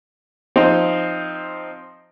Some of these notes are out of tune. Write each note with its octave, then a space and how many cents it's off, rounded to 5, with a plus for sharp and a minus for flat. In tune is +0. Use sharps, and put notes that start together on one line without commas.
F3 +5 C4 +0 D#4 +0